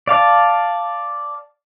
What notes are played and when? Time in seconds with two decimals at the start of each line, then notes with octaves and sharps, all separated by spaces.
0.07 D5 F5 A5